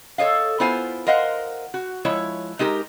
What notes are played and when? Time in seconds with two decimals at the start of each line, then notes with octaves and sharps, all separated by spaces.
0.18 A4 C#5 D#5 F5
0.60 B3 E4 F4 C5 G#5
1.07 A#4 C5 D#5 F5 F#5
1.74 F#4
2.05 F3 G#3 E4 C#5
2.59 G#3 D#4 G4 A#4